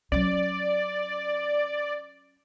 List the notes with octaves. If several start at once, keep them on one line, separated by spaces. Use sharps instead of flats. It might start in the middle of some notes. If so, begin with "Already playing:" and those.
F#3 C#4 D5